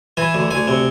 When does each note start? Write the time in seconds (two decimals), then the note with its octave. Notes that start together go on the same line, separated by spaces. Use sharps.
0.17 E3 G#5
0.35 D2
0.51 D2 G#5
0.68 C3